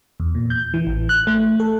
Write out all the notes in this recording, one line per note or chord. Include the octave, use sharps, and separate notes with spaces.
E2
A#2
G6
E3
A1
F#6
A3
A4